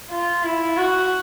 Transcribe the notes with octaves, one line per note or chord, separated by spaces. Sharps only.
F4
E4
F#4